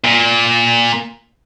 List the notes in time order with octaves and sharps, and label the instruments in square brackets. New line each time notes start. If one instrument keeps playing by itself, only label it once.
[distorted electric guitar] A#2